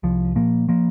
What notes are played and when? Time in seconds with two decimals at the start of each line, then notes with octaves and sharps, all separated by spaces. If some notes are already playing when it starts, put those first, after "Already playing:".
0.03 C2 F3
0.35 A#2 F3 A#3
0.68 F3 A#3